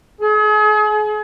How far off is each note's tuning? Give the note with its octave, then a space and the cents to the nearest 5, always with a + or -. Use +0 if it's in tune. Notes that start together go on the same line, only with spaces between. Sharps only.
G#4 +40